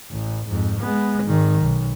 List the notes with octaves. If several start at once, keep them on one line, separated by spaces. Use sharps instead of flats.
A1
F2 G#2
G#3 B3
G#1 D#3
B1